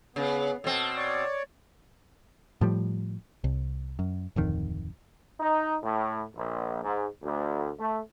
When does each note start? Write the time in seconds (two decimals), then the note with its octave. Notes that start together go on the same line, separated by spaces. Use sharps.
0.16 C#3 B3
0.64 B2 C4 A4
0.96 C#5 D5
2.61 A2 F3 G3
3.44 C2
3.99 F#2
4.36 D1 F2 D#3
5.40 D#4
5.82 A2
6.35 A#1
6.83 G#2
7.22 D2
7.79 A3